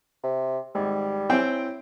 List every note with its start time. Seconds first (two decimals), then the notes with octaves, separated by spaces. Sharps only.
0.24 C3
0.75 G#1 G3
1.30 C4 E4 C#5 G5 G#5